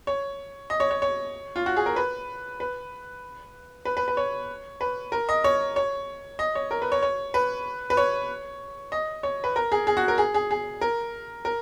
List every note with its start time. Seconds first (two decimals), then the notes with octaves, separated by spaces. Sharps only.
0.07 C#5
0.70 D#5
0.80 C#5
0.91 C#5
1.02 C#5
1.56 F4
1.66 F#4
1.76 G#4
1.86 A#4
1.96 B4
2.60 B4
3.85 B4
3.97 B4
4.08 B4
4.17 C#5
4.81 B4
5.12 A#4
5.29 D#5
5.44 C#5
5.76 C#5
6.39 D#5
6.55 C#5
6.71 A#4
6.82 B4
6.92 C#5
7.02 C#5
7.34 B4
7.90 B4
7.97 C#5
8.92 D#5
9.23 C#5
9.44 B4
9.56 A#4
9.72 G#4
9.87 G#4
9.97 F#4
10.08 A#4
10.18 G#4
10.34 G#4
10.51 G#4
10.81 A#4
11.45 A#4